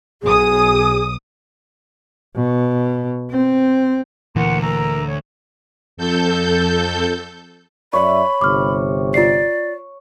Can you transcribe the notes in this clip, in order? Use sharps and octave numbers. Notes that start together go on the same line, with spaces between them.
B1 G#4 D#6
B2
C4
D2 A#2 E3 A#4 F#5 C6
A#4 A#5 E6
C#5
F2 A4 G6
F#2 C#5 D5 E5 B5
G1 C3 D6 F6
F4 D5 C7